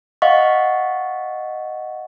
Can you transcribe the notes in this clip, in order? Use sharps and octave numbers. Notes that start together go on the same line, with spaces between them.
D#5 F5 F#5 C#6